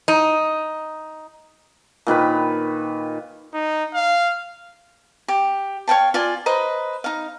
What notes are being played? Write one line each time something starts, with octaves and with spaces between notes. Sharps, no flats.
D#4
A#2 D#3 B4 B5
D#4
F5
G4
C#5 F5 G5 A5
F4 D5 G#5
B4 C5 D#5 A#5
D#4 F5